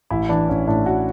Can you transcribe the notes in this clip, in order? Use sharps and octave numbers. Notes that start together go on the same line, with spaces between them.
A1 E4
E3 D4
A1 C#4
A2 D4
A2 F#4